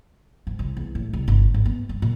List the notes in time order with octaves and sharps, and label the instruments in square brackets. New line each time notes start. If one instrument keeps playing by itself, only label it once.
[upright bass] G#2
C2
E2
A2
C2
G1
G#1
B3
G2
A#2